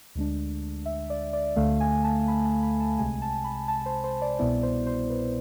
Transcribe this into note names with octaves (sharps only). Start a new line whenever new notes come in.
D2 D3 G#3 D4
E5
D5
D5
D2 D3 A3 F5
G#5
A5
B5
A5
B5
A5
C2 C3 G#3 G#5
A5
B5
A5
C5
C5
D5
C2 B2 B3 E4 D5
C5
C5
B4